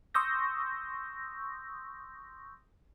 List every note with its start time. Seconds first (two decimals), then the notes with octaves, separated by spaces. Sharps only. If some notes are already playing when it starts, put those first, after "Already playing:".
0.14 C6 C#6 D#6 E6 G6 A#6